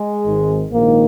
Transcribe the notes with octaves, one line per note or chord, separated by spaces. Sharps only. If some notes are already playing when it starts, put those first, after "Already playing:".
Already playing: G#3
G#1 G#2 D#3
A#1 G#2 D#3 A#3